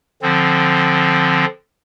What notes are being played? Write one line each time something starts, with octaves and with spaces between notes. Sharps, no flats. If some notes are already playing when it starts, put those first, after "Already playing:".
D3 F3 C4